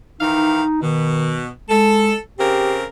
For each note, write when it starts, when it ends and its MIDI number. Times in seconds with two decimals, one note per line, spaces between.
0.21 0.62 51
0.21 0.62 52
0.21 0.82 63
0.21 0.62 77
0.82 1.48 47
0.82 1.42 51
1.70 2.13 56
1.70 2.19 69
2.39 2.84 49
2.39 2.84 60
2.39 2.76 67
2.39 2.84 70